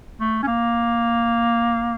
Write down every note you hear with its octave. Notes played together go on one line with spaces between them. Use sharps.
A3
C#4
A#3